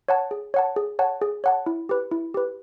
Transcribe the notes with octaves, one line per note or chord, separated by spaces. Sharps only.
C#5 F#5 A5
G#4
C#5 F#5 A5
G#4
C#5 F#5 A5
G#4
C#5 F#5 A5
E4
G4 B4
E4
G4 B4